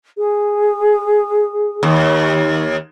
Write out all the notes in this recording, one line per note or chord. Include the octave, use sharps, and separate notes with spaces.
G#4
D#2